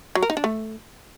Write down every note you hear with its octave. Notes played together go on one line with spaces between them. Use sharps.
F#3
A#4
D#4
D4
A3